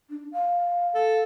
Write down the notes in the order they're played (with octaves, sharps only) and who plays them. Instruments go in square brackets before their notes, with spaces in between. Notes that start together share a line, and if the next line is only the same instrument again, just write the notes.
[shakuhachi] D4
F5
[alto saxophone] A4